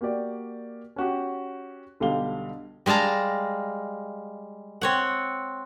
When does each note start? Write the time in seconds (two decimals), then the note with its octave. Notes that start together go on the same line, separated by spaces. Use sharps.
0.01 A#3 F#4 G4 D5
0.96 C#4 F#4 G4
2.00 B1 D3 G3 G4 F5 G7
2.86 G3 G#3 F5 A5 A#5
4.81 C4 C#5 F#5